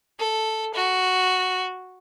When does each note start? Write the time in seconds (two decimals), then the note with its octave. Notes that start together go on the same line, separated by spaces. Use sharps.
0.19 A4
0.75 F#4